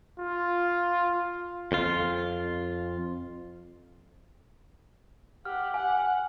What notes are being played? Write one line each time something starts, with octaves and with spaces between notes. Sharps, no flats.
F4
F2 F4
G4 F#5 F6
F#5 G#5